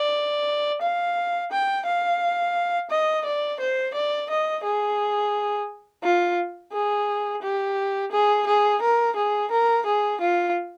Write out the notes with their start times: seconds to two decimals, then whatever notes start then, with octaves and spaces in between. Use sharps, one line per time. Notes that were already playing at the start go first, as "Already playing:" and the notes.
Already playing: D5
0.82 F5
1.51 G5
1.86 F5
2.90 D#5
3.25 D5
3.60 C5
3.94 D5
4.30 D#5
4.64 G#4
6.03 F4
6.73 G#4
7.42 G4
8.11 G#4
8.47 G#4
8.82 A#4
9.16 G#4
9.51 A#4
9.86 G#4
10.21 F4